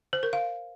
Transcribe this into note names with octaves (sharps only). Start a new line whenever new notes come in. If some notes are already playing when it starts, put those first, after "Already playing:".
C5
A#4
F5